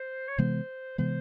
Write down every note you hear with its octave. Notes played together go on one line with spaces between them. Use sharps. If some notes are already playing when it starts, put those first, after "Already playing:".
Already playing: C5
C#5
C3 E3 G#3 B3 C5
C3 E3 G#3 B3 C5